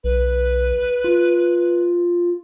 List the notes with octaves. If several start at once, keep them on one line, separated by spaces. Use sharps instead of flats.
B1 B4
F4